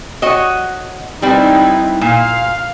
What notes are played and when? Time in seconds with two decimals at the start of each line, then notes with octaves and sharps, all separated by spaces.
0.22 F#4 C#5 D#5
1.22 G3 C4 D#4 E4 B4
2.01 A#2 F5